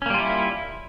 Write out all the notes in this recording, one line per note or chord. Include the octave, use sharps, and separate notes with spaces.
G3 A#3 C#4 E4 F4